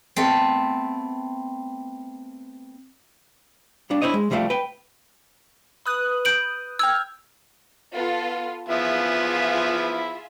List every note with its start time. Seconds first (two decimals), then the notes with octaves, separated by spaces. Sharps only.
0.16 A3 B3 C4
3.90 G3 A#3 D4
4.02 D4 E4 C5 C#5 D#5
4.14 G#3
4.30 C2 D#3 F3 G3 A3 F5
4.50 B4 G5
5.85 B4 D#6 F#6
6.25 G6 D7 F#7
6.79 G5 E6 F6 G#6
7.94 B3 F4 A4
8.69 F3 B3 E4 F4 G#4 E5